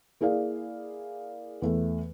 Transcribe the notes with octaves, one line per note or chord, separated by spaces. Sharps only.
A#3 E4 G#4 D5 F5
E2 A3